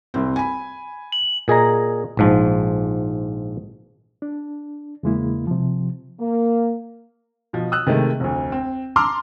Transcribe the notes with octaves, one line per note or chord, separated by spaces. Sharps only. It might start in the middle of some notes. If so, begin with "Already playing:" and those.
C2 C4
G#5 B5
F#7
A#2 G#4 D#5 A#5
A#1 G#2 F3
D4
E2 C#3 G#3 A#3 E4
C3 F3
A#3
B2 F3
D#6 E6 F#6
C3 D#3 G#3 A3
F1 D2
C4
A5 A#5 C6 D6 E6 F6